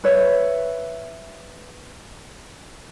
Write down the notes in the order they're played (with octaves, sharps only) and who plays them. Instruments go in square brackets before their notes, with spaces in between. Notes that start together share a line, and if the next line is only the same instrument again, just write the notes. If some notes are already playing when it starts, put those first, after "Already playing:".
[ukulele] B4 C#5 E5